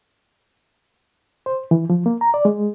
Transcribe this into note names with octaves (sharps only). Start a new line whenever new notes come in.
C5
E3
F3
A#3
A#5
D5
G#3